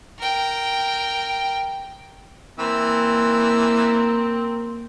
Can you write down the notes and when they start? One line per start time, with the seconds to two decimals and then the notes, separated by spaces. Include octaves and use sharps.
0.19 A#4 G5
2.59 E3 A#3 C4 A#4 E6